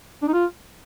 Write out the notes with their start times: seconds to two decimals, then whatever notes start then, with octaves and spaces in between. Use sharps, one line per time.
0.22 D4
0.28 D#4
0.34 F4